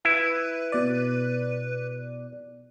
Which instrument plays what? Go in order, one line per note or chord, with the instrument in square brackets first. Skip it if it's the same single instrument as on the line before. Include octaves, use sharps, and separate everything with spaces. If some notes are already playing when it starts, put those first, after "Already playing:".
[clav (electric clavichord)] E4 [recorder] B4
[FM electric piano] B2 D5